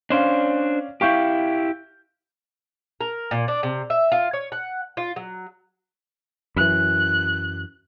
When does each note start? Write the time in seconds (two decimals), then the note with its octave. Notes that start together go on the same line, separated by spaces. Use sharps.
0.10 C#4 D4 C5 D5 F5
1.01 E4 G4 F5 C#6 G6
3.01 A#4
3.31 A#2
3.48 D4
3.63 C3
3.90 E5
4.12 F4
4.33 C#5
4.52 F#5
4.97 F4
5.16 F#3
6.56 F#2 E3 F#6